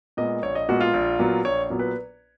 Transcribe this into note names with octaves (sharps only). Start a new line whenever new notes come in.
A#2 G#3 B3 D#5
A#1 C#5
D#5
A#2 G#3 B3 F#4
F4
A#1
A#2 F#3 B3
A#1 C#5
A#2 F#3 B3
B4